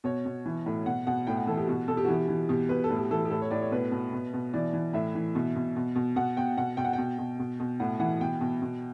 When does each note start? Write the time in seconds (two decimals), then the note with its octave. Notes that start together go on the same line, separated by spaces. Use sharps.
0.04 B2 C#5
0.25 B2
0.46 E3
0.66 A2
0.86 B2 F#5
1.07 B2 F#5
1.27 A2 G5
1.37 F#5
1.47 E3 A4
1.57 G4
1.68 B2 F#4
1.88 B2 A4
1.97 G4
2.05 F#4
2.08 E3 G4
2.28 E3
2.49 B2 G4
2.69 B2 B4
2.84 A4
2.90 A2
2.96 G4
3.10 E3 A4
3.25 G4
3.30 A2 A4
3.42 C#5
3.51 A2 D5
3.61 C#5
3.72 B2 B4
3.91 B2
4.12 B2
4.33 B2
4.54 E3 D5
4.73 E3
4.93 A2 E5
5.15 E3
5.35 B2
5.56 B2
5.76 B2
5.95 B2
6.16 B2 F#5
6.37 B2 G5
6.57 B2 F#5
6.77 B2 G5
6.85 F#5
6.93 B2 G5
7.18 B2
7.39 B2
7.60 B2
7.80 A2 F#5
7.99 E3 F#5
8.20 B2 G5
8.41 B2
8.62 B2